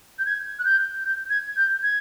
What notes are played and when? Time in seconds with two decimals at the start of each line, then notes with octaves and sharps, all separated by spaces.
0.19 G6
0.26 G#6
0.59 F#6
0.65 G6
1.04 G6
1.30 G#6
1.57 G6
1.83 G#6